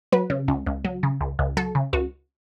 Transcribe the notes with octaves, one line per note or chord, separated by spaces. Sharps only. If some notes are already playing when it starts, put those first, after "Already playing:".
F#3 B4
C#3
C#2
C#2
F#3
C#3
C#2
C#2
F#3 A4
C#3
C#2 F#4